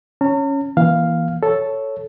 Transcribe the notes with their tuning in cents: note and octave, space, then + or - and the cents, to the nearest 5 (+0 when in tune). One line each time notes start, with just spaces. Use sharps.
C#4 +0 A#5 -45
E3 +0 A#3 +30 F5 +0
A4 +0 C#5 +0